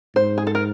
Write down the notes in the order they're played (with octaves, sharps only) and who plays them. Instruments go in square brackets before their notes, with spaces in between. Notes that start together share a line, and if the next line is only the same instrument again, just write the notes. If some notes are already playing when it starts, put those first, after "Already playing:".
[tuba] G#2 [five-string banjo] C5
[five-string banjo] G#4
A4
A#4